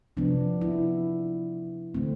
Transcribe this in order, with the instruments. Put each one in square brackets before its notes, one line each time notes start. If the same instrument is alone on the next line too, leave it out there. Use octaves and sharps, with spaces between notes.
[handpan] C3 F3 B3 D4
E4
D3 A3 C4